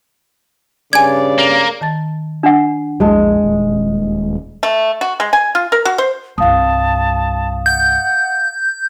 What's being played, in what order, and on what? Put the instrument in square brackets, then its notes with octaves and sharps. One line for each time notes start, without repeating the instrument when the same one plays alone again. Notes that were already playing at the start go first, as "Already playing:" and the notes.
[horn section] G2 D5 [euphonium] C#3 [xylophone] G#5 G#6
[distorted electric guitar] A#3
[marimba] D#3 A5 A6
[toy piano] D4 F#5
[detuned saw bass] A#1 [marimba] E2 A5 [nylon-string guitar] G#3
[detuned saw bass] D#1
[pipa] A3
F#4
G#3
G#5
F4
A#4
F#4
C5
[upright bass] C2 G2 [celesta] F5 D#6 [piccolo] A5
[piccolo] F#5 [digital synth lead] G6